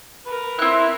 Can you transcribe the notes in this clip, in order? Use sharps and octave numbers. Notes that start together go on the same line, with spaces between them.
A#4 B4
C4 E4 F#6